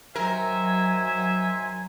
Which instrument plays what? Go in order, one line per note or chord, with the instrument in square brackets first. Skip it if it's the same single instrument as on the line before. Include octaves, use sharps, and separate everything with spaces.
[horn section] D#3 C5 E5 [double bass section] F#3 [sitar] A#4 [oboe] G#5